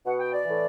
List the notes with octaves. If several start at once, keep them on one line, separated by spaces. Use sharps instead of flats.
B2 F#5
G5
D5
A2 E3